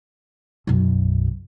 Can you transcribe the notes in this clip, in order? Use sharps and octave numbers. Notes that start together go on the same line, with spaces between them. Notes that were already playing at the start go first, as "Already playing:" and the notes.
B1 F#2